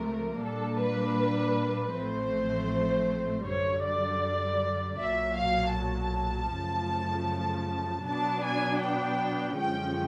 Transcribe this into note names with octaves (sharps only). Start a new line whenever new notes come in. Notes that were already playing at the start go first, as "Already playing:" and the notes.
Already playing: C#2 C3 F3 A3 A#4
A#2 G3 A#3 D4 A4
B4
A1 A2 F3 A3 C4 C5
F#2 D3 G3 C#5
D5
B1 A#2 F#3 E5
F5
A5
F#2 C#3 F3 A3
B2 F#3 B3 D4 A5
G#5
G5
F#2 D3 F3 G#3 C#4 G5